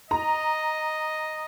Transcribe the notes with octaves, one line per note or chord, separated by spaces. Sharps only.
D#5 A#5